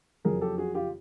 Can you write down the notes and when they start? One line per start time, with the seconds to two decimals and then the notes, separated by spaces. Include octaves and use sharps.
0.24 F#1 F2 C#3 F#3 G#4 A#4
0.41 G4 A4
0.58 F#4 G#4
0.74 F4 G4